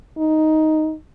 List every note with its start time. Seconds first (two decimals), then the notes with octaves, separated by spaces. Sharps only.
0.18 D#4